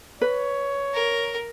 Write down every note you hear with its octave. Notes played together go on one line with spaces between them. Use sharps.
B4 C#5
A#4